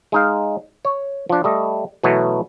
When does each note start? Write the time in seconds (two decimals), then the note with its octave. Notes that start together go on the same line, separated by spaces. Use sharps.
0.12 G#3 D#4 F5
0.85 C#5
1.29 F3 D4
1.44 G3 A3 D#5
2.03 B2 E3 F#3 A3 B3